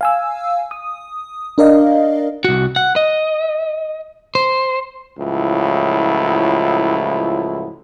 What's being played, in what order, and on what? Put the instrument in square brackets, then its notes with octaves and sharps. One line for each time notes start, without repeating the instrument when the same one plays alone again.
[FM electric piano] F5 G#5 E6
D#6
D4 A#4 D5 D#5 F5
[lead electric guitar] C2 F#4
F#5
D#5
C5
[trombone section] C#2 A2 F3 F#3 E4